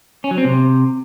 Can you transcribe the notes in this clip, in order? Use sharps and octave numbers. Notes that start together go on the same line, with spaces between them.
C#4
F#3
C4
C3